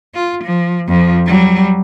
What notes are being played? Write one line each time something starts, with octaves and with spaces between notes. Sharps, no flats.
F4
F3
F2 F3
F#3 G3